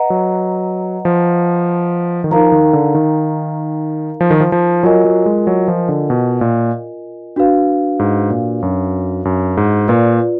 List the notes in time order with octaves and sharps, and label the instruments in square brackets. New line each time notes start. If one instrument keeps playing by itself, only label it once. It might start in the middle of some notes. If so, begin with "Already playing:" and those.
Already playing: [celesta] B4 D#5 F#5 A#5
[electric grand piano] F#3
F3
D#3
[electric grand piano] F3 [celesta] D#4 A#4 F5 A#5
[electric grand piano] D#3
D3
D#3
F3
D#3
F3
F3
[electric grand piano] F#3 [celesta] F4 A#4 D#5 G#5
[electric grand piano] F#3
G#3
F#3
F3
D3
B2
A#2
[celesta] D4 F#4 B4 F5
[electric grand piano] G#2
A#2
F#2
F#2
G#2
[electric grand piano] A#2 [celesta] F4 B4 D5